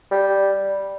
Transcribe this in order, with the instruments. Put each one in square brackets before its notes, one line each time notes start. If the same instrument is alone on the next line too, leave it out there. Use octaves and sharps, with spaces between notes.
[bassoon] G3